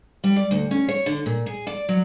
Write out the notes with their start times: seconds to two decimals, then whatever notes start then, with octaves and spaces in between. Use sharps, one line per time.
0.24 G3
0.36 D5
0.51 D2
0.71 C#4
0.88 C#5
1.06 D3
1.26 A#2
1.46 G#4
1.67 D5
1.89 F#3